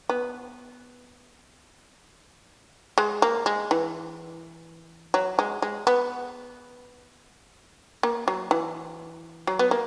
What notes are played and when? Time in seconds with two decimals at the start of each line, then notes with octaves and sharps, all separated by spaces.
0.09 B3
2.98 G#3
3.22 A#3
3.46 G#3
3.71 E3
5.14 F#3
5.39 G#3
5.62 G#3
5.87 B3
8.03 A#3
8.28 F#3
8.51 E3
9.47 F#3
9.59 B3
9.71 A#3